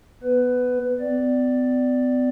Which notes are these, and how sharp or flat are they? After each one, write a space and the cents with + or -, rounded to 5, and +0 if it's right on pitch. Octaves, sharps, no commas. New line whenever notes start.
B3 +0 B4 +15
B3 +45 D5 +0